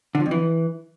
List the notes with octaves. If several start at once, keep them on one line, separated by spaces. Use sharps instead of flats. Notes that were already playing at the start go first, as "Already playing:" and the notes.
D3
F3
F2
E3